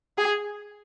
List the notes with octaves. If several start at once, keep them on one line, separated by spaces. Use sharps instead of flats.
G#4